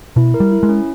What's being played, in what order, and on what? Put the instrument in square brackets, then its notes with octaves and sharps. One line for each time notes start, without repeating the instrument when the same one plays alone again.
[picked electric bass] B2 [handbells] E4
[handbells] A#4
[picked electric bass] G3
[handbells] E4
[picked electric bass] G#3
[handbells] C#4